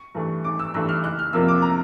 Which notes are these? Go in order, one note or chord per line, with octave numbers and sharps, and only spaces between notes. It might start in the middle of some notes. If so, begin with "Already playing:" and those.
Already playing: C#6
G2 E3 A3
G#1 D6
E6
G2 E3 A3 E6
F6
F#1 F#6
F6
F2 C3 F3 A#3 E6
D6
A#5